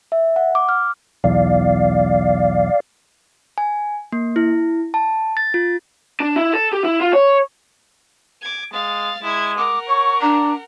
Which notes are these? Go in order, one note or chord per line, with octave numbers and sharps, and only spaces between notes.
E5
F#5
D6
F6
B1 E2 D5 F5
G#5
A#3
E4
A5
A6
F4
D4
E4
A4
G4
E4
F4
C#5
D6 G#6
G#3 F5 A6
G#3 E4 G#6
A#4 F#5 D6
C#5 C#6
D4 D5 A#5